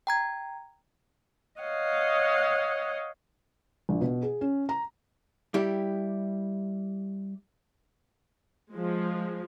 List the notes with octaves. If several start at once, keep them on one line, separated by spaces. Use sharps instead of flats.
G5 A#5 G#6
C#5 D#5 F5 F#5
A#1
B2
G#4
C#4
A#5
G3 E4 G4
F3 G#3